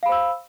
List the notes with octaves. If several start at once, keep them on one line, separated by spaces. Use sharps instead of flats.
C5 F5 B5 E6